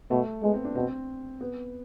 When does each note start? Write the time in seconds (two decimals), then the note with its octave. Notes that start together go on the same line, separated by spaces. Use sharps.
0.11 B2 A3
0.43 G#3 B3
0.54 C4
0.65 D4
0.75 B2 C4
1.41 B3